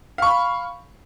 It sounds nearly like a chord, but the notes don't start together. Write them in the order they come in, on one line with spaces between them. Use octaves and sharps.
F5 C#6 B5